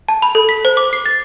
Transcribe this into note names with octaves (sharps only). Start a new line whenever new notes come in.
A5
B5
A4
B6
C5
D6
C7
A6